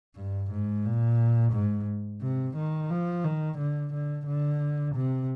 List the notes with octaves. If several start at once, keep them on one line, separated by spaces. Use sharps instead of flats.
G2
G#2
A#2
G#2
C3
D#3
F3
D#3
D3
D3
D3
C3